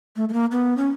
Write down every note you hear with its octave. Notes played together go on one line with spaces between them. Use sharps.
A3
A3
A#3
B3
C#4